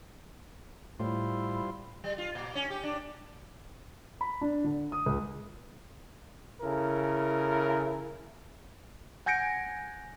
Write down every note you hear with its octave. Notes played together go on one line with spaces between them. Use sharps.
A2 G3 E4 F4 C5
G3
F4
A#2
C#4
G4
D4
B5
D4
D3
D#6
C#2
C#3 E4 A4 A#4
F#5 G#5 G6 A#6 C#7 D7